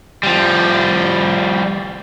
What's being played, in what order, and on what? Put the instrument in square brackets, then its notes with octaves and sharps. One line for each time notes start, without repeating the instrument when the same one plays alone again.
[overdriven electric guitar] F3 G3